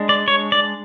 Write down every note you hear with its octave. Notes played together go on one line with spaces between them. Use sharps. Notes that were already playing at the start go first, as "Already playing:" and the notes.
Already playing: G#3 D4
D5
C#5
D5